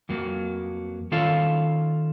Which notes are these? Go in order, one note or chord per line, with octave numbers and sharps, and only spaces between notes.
F2 F#3 A#3
D#3 C#4 F4 A4 F5